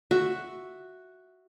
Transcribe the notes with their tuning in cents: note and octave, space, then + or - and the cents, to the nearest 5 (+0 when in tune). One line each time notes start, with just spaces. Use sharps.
F#4 +0 E5 +0